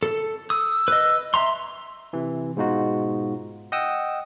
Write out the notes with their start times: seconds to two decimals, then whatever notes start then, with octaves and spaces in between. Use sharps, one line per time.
0.03 A4
0.50 D#6 E6
0.88 B4 D#5
1.34 E5 A#5 C6
2.13 C3 E3
2.57 G#2 B2 G#3 D#4 F4 F#4
3.72 D#5 F#5 G5 D#6 E6